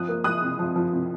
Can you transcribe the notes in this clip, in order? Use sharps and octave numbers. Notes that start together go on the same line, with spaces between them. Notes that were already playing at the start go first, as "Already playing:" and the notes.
Already playing: F3 C4 D#6 F#6
A#3
F3 D#6 F#6
C3
F3
F3
C3